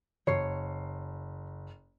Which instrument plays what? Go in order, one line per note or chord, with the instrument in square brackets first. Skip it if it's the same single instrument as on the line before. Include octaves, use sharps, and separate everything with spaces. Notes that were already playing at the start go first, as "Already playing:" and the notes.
[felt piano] F#1 C7 [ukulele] C#5